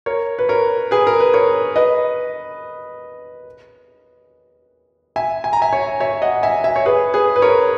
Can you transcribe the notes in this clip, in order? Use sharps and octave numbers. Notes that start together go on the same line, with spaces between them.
A#4 C#5
B4
A#4 C#5
G#4 B4
A#4
B4
A#4 C#5
B4 D#5
E5 G#5
G#5
A#5
E5 G#5
C#5 E5
C#5 E5
D#5 F#5
E5 G#5
E5 G#5
C#5
G#4 B4
G#4 B4
B4
A#4 C#5